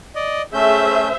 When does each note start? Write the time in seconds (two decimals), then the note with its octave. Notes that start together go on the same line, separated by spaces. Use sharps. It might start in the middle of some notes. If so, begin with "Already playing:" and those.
0.15 D5 D#5
0.54 A3 C#4 G#4 C5 E5 G6